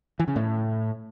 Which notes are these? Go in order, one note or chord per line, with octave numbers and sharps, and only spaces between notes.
E3
C#3
A2